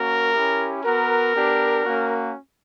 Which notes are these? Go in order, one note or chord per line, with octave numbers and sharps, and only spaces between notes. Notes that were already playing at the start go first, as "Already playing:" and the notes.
Already playing: A#3 C#4 F#4 A#4
C#4 E4 G4
B3 F#4 A#4
B3 D4 G4
A#3 C#4 F#4